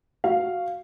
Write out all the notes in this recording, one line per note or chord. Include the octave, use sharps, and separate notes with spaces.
F#4 F5